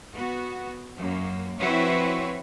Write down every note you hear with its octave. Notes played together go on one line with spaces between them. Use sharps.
B3 F#4
F#2 A#3
F3 C4 E4 F#4 B4 C#5